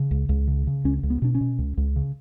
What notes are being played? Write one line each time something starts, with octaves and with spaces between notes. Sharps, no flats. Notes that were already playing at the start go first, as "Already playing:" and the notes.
Already playing: C#3
C#2
C#2
C#3
C#3
C#2 C#4
C#2
B3
B2 D4
C#4
B2
C#2
C#2
C#3